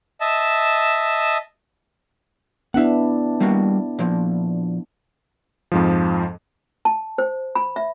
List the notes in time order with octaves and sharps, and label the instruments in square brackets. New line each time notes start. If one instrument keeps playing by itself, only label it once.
[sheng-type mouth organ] D#5 E5 A5
[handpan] B3 D4 E4 [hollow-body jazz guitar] E5 F#5
[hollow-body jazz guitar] G3 A#3 F#4
A#2 F3
[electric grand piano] F2 G#2 F3
[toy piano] A5
C5
B5
E5